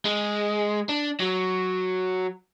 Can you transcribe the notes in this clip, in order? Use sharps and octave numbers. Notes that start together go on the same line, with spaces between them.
G#3
D4
F#3